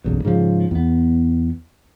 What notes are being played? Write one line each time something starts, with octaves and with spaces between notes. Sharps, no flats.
F#1 B1 E2
G#2 C#3 F3
E2 B3